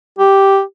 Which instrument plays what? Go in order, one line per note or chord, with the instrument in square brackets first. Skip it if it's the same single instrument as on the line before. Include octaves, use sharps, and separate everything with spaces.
[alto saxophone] G4